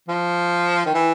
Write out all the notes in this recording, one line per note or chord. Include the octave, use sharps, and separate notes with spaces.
F3
D#3
E3